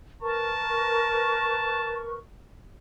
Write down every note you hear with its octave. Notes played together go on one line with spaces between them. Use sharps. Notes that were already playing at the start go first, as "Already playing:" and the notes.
A#4 B4 A5 C#6